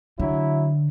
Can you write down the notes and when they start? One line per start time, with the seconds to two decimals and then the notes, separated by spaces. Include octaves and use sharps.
0.19 D3 F#3 E4